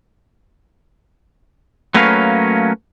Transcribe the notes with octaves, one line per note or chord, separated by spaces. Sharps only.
F#3 A3 A#3 C#4 B4 F5